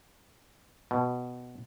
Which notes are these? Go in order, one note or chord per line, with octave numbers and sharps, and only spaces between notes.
B2